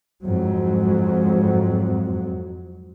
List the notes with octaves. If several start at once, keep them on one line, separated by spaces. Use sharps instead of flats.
F2 G#2 F#3